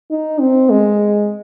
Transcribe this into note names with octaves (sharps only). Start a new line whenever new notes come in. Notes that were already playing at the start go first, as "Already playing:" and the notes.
D#4
C4
G#3